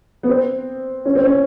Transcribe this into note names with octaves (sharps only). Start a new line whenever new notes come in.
B3
C4
C#4
C4
C#4